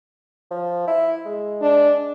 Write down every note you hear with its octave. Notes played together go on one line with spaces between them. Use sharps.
F3
E4
G#3
D4